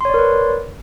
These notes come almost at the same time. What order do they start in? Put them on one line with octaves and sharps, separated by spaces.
C6 C#5 D5 A#4 B4